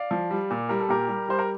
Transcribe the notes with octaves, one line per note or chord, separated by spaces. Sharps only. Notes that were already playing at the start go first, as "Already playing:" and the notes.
Already playing: D5 F5
F3
G3
A#2
G3 A#4
A4
A#2 G4 A#4
G3
G3 C5
A#4